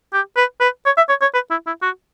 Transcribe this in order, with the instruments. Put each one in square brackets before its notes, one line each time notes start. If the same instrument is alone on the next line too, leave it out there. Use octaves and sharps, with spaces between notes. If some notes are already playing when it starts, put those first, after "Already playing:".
[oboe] G4
B4
B4
C#5
E5
C#5
C#5
B4
E4
E4
F#4